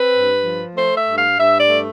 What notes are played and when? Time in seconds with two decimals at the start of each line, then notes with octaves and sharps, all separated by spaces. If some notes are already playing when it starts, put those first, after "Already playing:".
Already playing: C4 B4
0.13 G2
0.43 F3
0.76 A3 C5
0.96 E5
1.06 G2
1.17 F5
1.37 G2 E5
1.59 D5
1.69 A3